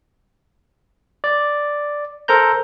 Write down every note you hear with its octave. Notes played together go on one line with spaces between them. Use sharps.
D5
A4 A#4 C5 A#5 G6